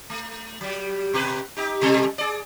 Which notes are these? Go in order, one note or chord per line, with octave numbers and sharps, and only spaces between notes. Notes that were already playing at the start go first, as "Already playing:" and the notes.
A3
F#3 G3
B2 G4 B4
D#4 G4
B2 G3 A4
G#4 D5